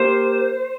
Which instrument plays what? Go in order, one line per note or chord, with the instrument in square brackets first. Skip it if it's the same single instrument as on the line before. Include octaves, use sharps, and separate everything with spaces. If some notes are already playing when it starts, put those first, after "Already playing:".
Already playing: [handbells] A#3 G4 A#4 [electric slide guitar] C5